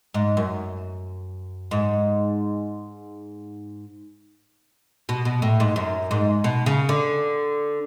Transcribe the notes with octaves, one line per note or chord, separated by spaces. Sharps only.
G#2
F#2
G#2
B2
B2
A2
G#2
F#2
G#2
B2
C#3
D3